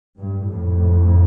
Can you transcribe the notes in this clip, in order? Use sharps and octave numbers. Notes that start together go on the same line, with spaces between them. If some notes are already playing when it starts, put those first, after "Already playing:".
G2
F2 A2